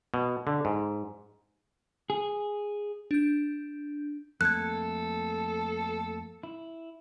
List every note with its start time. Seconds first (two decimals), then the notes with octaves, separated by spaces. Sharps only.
0.14 B2
0.47 D3
0.65 G#2
2.10 G#4
3.11 D4 G6
4.41 F2 A3 A#3 A4 F#6 G#6
6.43 E4